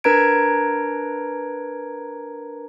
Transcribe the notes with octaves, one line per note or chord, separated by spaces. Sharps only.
D4 A#4 B4 A#5 G#6 D7